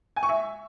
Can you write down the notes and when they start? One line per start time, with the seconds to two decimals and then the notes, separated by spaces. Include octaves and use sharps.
0.16 G#5
0.23 C#6
0.29 E5